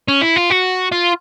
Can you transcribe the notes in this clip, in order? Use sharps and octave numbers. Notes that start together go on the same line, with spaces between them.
C#4
E4
F4
F#4
F4